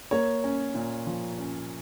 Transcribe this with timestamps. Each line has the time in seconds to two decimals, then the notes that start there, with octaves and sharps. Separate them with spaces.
0.11 A#3 C#5
0.44 C#4
0.75 A#2
1.07 F3
1.38 C#4